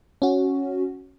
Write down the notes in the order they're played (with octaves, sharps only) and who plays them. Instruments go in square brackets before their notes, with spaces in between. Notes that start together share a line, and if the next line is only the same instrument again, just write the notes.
[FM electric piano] C#4 F#4